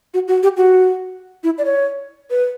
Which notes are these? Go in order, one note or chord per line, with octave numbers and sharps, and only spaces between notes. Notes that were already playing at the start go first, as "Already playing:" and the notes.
F#4
F#4
G4
F#4
E4
D5
C#5
B4